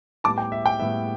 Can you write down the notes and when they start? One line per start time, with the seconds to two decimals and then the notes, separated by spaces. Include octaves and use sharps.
0.24 A2 G3 B3 A5 D6
0.38 G5
0.52 E5
0.66 G5
0.80 A2 G3 B3 E5